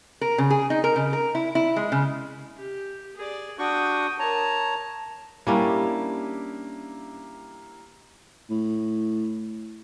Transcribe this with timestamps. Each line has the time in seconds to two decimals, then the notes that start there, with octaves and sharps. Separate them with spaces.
0.21 A#4
0.38 C#3
0.50 G#4
0.70 D#4
0.84 A#4
0.96 C#3
1.13 A#4
1.35 E4
1.55 E4
1.76 G#3
1.92 C#3
2.57 G4
3.16 G#4 D5
3.59 D4 F#4 G5 C#6 D#6
4.19 A#4 C#5 A5 A#5
5.47 G3 A#3 C#4 D4 E4 G4
8.50 A2